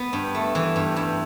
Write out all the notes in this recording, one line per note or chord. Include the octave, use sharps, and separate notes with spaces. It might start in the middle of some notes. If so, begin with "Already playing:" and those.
Already playing: B3
G2
A3
E3
G2
G2